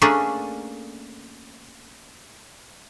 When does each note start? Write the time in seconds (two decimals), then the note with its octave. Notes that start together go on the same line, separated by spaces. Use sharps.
0.02 A3 A#3 C#4 D4 G#4